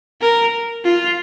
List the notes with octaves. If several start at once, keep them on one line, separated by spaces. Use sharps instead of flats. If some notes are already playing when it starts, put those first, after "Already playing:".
A#4
F4